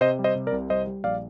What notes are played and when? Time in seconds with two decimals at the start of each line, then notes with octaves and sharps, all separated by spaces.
0.01 C3 C5 D#5
0.19 G3
0.24 C5 D#5
0.35 C3
0.47 A#4 D5
0.52 C2
0.70 G3 C5 D#5
0.87 G3
1.04 A#1 D5 F5